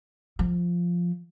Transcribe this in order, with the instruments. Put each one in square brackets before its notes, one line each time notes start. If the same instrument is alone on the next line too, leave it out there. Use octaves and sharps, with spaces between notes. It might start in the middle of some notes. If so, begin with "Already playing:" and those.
[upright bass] F3